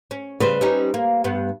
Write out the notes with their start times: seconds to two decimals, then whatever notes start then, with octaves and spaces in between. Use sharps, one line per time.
0.11 C#4
0.40 C#3 G3 B4 C5
0.61 G3 C#4 D#4
0.94 A#3
1.24 G2 B3